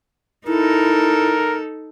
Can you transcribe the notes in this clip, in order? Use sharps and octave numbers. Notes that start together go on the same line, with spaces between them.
D#4 E4 A4 A#4